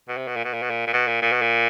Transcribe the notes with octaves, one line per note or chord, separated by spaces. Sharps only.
B2
C3
B2
A#2
B2
A#2
B2
A#2
A#2
B2
A#2
A#2
B2
A#2